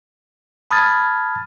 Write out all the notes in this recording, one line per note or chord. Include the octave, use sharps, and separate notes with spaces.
A5 B5 D#6 F6 G#6 A6